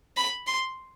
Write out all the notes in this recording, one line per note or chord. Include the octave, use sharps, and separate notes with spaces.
B5
C6